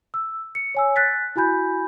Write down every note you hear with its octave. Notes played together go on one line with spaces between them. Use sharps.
E6
C#7
C#5 G#5 E6
F#6 A6 B6
E4 F#4 G#5 B5 G6